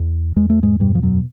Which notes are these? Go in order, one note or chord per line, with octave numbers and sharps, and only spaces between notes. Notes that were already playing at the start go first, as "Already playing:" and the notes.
Already playing: E2
E2 G#3
A3
G#2 G#3
G2 B2 G3
F3
F#2 F#3